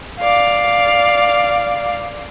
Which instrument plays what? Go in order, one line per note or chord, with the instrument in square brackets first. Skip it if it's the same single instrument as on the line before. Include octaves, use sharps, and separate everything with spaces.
[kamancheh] D5 F5